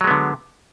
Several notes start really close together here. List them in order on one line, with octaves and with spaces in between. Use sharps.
F#3 G#3 B3 D3